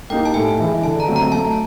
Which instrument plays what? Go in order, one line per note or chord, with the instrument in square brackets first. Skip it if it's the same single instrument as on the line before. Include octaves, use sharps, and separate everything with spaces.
[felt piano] A#3 D#4 G4 [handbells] G5
[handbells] A5
[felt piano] A2 [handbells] G#5
[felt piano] E3 G#3
[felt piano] D3 [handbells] A5
[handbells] A#5
[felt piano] F#3 A3 C4
[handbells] A#5
[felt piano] A3 [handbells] A5